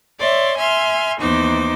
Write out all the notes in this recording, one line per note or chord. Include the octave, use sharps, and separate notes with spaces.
C#5 D5 E5 C6
E5 G#5 C6 F6
D#2 E3 B3 D#4 C5 D6